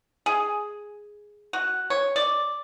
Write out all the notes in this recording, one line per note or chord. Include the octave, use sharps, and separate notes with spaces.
G#4
F#4
C#5
D5